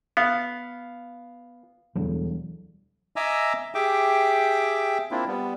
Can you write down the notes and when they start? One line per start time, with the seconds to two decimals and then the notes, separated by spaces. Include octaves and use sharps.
0.17 B3 F5
1.95 E1 D2 E3 F#3 G3
3.16 D#5 E5 G#5 A#5 D6 E6
3.75 G4 G#4 E5 G5 D6
5.11 A#3 C4 D4 E4 F4
5.27 G3 B3